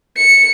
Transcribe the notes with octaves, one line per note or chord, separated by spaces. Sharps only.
C#7